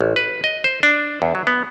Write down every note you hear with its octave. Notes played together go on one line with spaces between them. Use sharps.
A1
B4
D#5
C5
D4
E2
F#3
B3